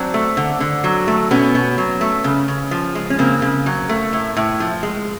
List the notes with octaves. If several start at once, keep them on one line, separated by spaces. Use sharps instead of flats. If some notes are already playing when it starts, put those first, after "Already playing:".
Already playing: F#3 C4 D4
A3
D3
D3
F#3
A3
B2 B3 C#4
B2
F#3
A3
C#3
C#3
F3
G#3
C#4
C#3 A#3 C4
C#3
F#3
A3
A2
A2
F3
G#3